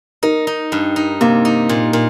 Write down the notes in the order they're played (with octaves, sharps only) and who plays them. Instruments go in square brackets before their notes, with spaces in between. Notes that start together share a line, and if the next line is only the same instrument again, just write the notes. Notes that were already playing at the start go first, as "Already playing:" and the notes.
[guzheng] D#4 [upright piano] A#4
[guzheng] D#4
G2
D#4
[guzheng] C3 [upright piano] A#3
[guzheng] D#4
A#2
A#2